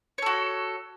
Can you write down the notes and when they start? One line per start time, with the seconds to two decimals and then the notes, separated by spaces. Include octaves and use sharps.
0.18 C#5
0.22 A4
0.26 F#4